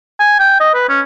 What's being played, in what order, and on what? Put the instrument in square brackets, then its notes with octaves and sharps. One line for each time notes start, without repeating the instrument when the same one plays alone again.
[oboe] G#5
G5
D#5
B4
C#4